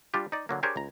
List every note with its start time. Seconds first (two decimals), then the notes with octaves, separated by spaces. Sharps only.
0.14 G3 D4 F4 G4
0.32 D#4 D5
0.49 D3 F#3 A#3
0.63 D4 G4 G#4 A#4 C5 C#5
0.76 C#2 A#5